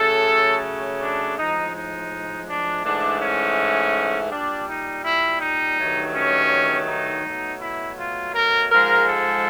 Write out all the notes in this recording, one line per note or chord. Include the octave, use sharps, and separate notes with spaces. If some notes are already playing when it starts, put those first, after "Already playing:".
Already playing: C#3 F#3 A3 A4
D4
A2 F3 G#3 D#4
D#4
D4
G#2 E3 A3 D4
C#4
A#2 G3 D4
D#4
E4
D#4
G2 D#3 F#3 A3
C#4
D#4
B2 F#3 A3
E4
F4
A#4
G#2 F3 G#3 A#4
A4